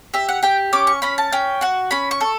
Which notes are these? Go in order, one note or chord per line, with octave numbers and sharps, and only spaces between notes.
G4 E5
F#5
G4 G5
C#4 D6
C#6
C#4 B5
A5
C#4 G5
F#4 F#5
C#4 B5
C#6
A4